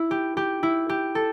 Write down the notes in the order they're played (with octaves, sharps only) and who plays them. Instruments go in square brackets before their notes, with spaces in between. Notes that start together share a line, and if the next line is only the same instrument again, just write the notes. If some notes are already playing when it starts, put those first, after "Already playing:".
Already playing: [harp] E4
G4
G4
E4
G4
A4